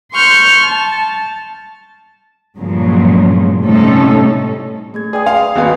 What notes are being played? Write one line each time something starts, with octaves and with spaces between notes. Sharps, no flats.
C6 C#6 F6 G6
A5
G2 A#2 C#3 F3 F#3 G#3
A2 C3 G3 C#4 D#4 A4
A3 G#4 G#6
G#4 D5 G5 D#6
F5 C6
G#1 B3 F#4 G#4 F5